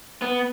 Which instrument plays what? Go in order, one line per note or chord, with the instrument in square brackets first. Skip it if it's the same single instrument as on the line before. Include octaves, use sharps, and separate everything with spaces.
[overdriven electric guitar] B3